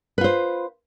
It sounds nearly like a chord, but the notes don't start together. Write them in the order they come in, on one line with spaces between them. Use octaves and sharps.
B4 F4 C5